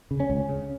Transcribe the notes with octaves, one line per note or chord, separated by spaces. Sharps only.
C#3
C#4
C#2
C#3